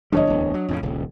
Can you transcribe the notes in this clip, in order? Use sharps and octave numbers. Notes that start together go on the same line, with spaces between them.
F#1 E3 G3 D4 C#5 D#5
D1 E2
F#3
F2 A2 C#3
D#1 C#2